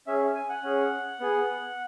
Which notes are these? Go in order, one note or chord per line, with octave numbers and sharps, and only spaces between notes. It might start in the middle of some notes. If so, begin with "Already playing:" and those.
C#4 G#4 E5
G#5
F#5
C#4 G#4
B3 G#4